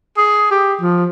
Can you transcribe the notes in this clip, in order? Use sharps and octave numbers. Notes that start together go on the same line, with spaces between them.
G#4
G4
F3